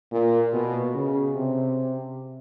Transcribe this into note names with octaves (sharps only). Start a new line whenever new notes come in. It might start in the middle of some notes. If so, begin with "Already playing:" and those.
A#2
B2
C#3
C3